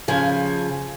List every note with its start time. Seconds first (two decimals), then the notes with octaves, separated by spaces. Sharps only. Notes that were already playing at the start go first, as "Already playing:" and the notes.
0.08 C#3 F3 G#5